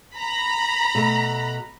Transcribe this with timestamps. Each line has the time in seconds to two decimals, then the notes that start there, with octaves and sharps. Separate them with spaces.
0.16 A#5 B5
0.95 B2 A3